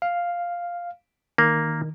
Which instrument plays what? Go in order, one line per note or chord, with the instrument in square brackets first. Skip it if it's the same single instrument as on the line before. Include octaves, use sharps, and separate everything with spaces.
[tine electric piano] F5
[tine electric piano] D#3 [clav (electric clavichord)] A#3